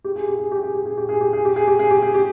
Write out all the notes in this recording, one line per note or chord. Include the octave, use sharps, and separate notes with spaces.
G4
G#4
G4
G#4
G4
G#4
G4
G#4
G4
G#4
G4
G#4
G4
G#4
G4
G#4
G4
G#4
G4